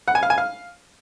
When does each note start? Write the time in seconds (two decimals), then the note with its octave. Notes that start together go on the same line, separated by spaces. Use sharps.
0.08 F#5
0.15 G#5
0.23 F5
0.30 G#5
0.38 F5